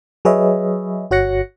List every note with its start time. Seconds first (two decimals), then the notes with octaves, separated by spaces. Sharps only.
0.25 F#3 G#4 B4 C#5 D#5 E5
1.11 G1 F#4 C#5 F#6 A#6 C#7